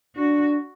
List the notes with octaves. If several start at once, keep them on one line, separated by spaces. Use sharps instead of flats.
D4 F#4